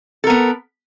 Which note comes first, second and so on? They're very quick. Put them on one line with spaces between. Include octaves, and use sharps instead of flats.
A4 A#4 B3